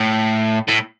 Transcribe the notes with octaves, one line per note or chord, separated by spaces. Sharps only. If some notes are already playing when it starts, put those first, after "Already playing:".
Already playing: A2
A2